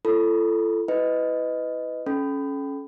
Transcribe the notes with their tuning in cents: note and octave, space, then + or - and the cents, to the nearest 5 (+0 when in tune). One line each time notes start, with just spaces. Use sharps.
F4 -45 A4 +0 B5 +0
E4 -5 B4 +20 D#5 +0
C#4 +0 A4 -35 B5 +25